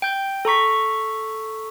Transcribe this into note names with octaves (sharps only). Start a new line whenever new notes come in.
G5 G6
A4 A#5 C#6 B6